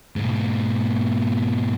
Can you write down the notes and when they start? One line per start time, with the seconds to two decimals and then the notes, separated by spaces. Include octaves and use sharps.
0.16 G#2 B2